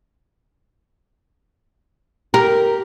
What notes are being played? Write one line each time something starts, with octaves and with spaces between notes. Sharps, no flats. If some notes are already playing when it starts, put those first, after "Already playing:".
G4 A#4